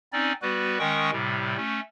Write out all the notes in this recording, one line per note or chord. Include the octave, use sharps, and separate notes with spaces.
C4 C#4 D#4 D5
G3 B3 F#4 B4
D#3 G#3 C#4 G5 C#6 D#6
A2 C3 G3
A3 C#4